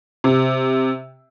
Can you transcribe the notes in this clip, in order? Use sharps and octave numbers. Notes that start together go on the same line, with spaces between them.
C3